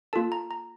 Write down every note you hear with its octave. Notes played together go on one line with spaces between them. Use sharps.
A#3 F4 A4 A5
A#5
A#5